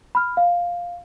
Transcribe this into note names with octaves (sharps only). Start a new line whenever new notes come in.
B5 F6
F5